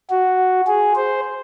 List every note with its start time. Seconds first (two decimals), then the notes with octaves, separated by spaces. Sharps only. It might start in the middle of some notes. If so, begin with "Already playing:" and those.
0.10 F#4
0.67 G#4
0.95 C5